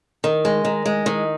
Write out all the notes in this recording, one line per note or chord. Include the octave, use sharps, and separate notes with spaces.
D#3
G#3
D#3
G#3
D#3